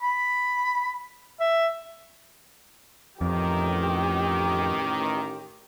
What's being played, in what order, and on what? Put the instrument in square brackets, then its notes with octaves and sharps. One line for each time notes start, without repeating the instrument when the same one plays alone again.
[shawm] B5
E5
[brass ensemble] A1 D#3 [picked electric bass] F2 [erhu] G4 [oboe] D6